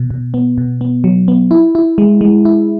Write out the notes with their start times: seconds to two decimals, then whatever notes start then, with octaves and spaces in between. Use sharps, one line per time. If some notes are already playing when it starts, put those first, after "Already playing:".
Already playing: B2
0.10 B2
0.34 B3
0.58 B2
0.81 B3
1.04 F#3
1.28 B3
1.51 E4
1.75 E4
1.98 G#3
2.21 G#3
2.45 E4